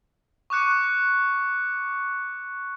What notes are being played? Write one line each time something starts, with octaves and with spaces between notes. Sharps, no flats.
C#6 D6 F#6 C#7